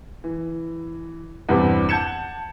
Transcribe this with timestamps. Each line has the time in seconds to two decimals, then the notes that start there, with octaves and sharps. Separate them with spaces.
0.24 E3
1.49 E2 G2 C3 G3 B3 C4
1.89 F#5 A5 G6 G#6 C#7 E7